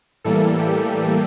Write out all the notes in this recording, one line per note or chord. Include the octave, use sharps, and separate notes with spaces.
A2 E3 G3 A#3 A4
G4